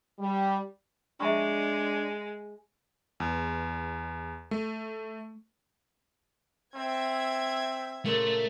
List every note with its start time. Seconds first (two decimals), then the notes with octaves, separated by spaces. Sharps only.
0.19 G3
1.20 G#3 D4 E5 A#5 C#6
3.20 E2
4.51 A3
6.75 C4 E5 G#6
8.06 A#2 C#3 A3 C6